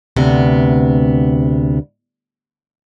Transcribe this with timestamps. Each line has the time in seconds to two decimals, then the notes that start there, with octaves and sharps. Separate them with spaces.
0.16 D2 C3 B3